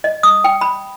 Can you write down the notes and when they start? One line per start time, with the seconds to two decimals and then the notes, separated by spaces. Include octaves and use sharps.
0.04 D#5
0.23 D#6
0.44 G5
0.61 B5